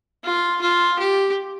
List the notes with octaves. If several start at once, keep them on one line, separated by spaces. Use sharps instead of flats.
F4
F4
G4